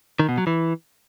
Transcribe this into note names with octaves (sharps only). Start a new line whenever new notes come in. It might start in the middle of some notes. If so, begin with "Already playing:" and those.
D#3
B2
F#3
E3